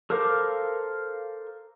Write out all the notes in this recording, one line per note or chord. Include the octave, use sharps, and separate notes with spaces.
A4 A#4 C5 F5 D6